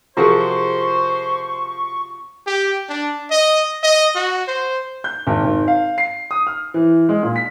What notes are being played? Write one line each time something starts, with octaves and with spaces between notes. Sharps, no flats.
C3 F3 F4 F#4 G#4 A#4 C5 C#6
G4
D4
D#5
D#5
F#4
C5
G6
G#1
G#1
F5
C7
D#6
F6
E3
G#3
A#2
B6